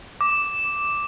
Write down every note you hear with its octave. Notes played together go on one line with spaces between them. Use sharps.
D6